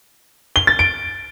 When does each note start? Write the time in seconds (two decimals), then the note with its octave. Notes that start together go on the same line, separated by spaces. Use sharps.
0.56 G7
0.67 A6
0.79 D7